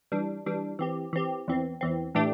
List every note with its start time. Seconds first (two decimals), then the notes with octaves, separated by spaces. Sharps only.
0.12 E3 G3 D4
0.46 E3 G3 D4
0.79 E3 C4 G4
1.13 E3 C4 G4
1.48 E2 E3 C4
1.81 E2 E3 C4
2.15 A2 E3 A3 D4 G4